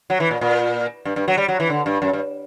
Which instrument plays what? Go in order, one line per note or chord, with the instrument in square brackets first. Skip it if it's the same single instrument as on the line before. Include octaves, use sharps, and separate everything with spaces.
[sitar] F#3
E3
A#2
A#2
G2
G2
F#3
G3
F#3
E3
D3
G2
F#2
G2